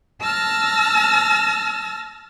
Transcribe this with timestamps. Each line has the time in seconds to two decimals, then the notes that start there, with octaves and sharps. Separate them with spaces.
0.21 A5 E6 F6 A6 A#6